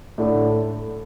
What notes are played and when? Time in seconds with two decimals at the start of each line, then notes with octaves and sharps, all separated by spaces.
0.18 A2 D3